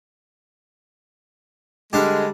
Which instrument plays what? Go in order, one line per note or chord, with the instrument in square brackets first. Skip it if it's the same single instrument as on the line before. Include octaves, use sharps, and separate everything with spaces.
[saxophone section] D3 G#3 [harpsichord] G3 D4 G4